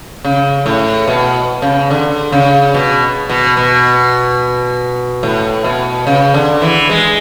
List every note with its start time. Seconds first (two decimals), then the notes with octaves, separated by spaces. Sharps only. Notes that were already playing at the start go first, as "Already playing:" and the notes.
0.25 C#3
0.66 A2
1.08 B2
1.62 C#3
1.91 D3
2.32 C#3
2.74 B2
3.29 B2
3.57 B2
5.23 A2
5.64 B2
6.07 C#3
6.34 D3
6.62 E3
6.90 G#3